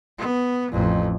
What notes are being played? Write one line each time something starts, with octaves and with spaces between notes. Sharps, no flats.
B3
A1 F2